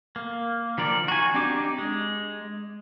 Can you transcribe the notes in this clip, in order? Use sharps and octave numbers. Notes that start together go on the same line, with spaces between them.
A#3
D#3 F3 A#4 D5
F#4 G#5
C4 D4 D#4 G4 D6
G#3